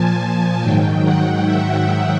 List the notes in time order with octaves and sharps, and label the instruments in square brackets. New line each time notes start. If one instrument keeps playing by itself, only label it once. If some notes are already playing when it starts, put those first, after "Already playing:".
Already playing: [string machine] A#2 F3 G#5 A5
G#5
G#2 D#3 F#3 G5
F#5
E5
G5